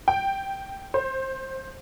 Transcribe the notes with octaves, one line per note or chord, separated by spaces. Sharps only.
G5
C5